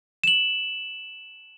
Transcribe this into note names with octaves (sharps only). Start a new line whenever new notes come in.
E7 F#7